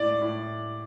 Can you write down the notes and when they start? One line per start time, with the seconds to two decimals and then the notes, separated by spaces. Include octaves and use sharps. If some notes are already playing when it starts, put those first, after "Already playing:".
Already playing: A2 D5
0.21 A2